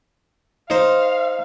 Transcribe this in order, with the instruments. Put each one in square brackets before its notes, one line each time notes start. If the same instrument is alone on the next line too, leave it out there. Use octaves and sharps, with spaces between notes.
[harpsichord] D#4 C5 [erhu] F5